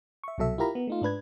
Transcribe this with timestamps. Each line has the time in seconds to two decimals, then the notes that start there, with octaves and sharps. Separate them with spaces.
0.24 E5 C#6
0.38 C2 B2 F#3 A4 E5
0.58 E4 F4 G4 A#4 A#5 B5
0.75 B3
0.88 A3 D#4 F4
1.02 G#2 D4 B4 G#6